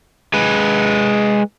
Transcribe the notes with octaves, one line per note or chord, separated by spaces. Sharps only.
G#3 B4